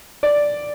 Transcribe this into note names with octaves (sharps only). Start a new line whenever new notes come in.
D5